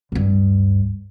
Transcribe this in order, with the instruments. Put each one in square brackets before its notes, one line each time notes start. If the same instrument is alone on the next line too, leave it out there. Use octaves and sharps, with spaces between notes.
[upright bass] D1 G2